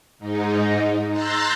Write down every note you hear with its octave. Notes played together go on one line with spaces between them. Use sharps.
G#2 D#4
A#5 C6 E6 F#6 G6 A6